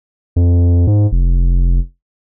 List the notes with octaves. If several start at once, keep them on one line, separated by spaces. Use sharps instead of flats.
F2
G#2
F1